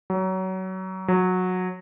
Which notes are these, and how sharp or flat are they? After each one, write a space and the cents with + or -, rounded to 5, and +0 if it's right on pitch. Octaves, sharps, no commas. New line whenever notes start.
F#3 +25
F#3 -15